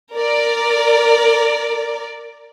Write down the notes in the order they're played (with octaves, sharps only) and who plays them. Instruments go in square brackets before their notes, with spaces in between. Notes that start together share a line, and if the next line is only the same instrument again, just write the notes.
[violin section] A#4 D5